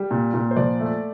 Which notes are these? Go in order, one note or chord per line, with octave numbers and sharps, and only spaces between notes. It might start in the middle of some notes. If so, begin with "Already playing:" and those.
Already playing: G3
A#2
A#2
C5
F3 D5
A3